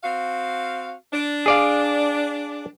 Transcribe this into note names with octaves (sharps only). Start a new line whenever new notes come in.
C4 F#4 F5
D4
G#4 D5 F5